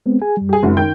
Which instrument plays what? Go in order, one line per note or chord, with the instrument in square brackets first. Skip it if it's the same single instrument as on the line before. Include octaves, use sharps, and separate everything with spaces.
[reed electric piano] G#3 B3 C4
G#4 G#5
F#2 G3
[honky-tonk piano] G4 G#4
[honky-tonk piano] F#1 C4 F#4 [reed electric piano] G#3 D#4
[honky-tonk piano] D#3 G5 G6